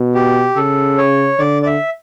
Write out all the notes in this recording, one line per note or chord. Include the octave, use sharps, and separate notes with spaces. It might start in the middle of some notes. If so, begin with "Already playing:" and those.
Already playing: B2
G4
C#3 A4
C#5
D3 D5
D5
E5